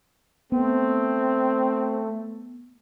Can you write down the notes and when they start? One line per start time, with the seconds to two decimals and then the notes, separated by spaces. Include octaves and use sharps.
0.52 A3 B3 C4